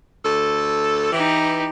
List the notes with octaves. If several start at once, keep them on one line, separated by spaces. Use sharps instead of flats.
D2 A4
E3 D#4 G4